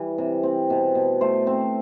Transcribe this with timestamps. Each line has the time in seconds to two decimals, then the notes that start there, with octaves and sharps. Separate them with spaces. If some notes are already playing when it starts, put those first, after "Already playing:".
Already playing: E3 G3
0.18 C3
0.43 C4
0.70 B2
0.95 B2
1.21 A3 C5
1.47 C4